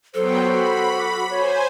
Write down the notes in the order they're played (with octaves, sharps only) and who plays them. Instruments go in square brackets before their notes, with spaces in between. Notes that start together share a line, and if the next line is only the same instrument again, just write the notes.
[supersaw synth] F#3 B3 G5 [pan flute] A4 [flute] C5
[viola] F#4 [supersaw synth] B5
[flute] D6
[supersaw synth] C5 G#5 [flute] C#5